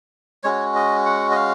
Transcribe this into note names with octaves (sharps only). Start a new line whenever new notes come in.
G#3 C#4 F#4 C#5
D#5
F#5
D#5
F5